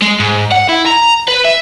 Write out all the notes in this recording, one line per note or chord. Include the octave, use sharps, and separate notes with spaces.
G#3
G#2
F#5
E4
A#5
B4
E5